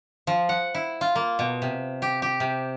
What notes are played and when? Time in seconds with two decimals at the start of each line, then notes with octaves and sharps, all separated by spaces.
0.27 F3
0.49 F#5
0.74 E4
1.01 F4
1.15 A#3
1.39 B2
1.62 C3
2.02 G4
2.22 G4
2.40 C3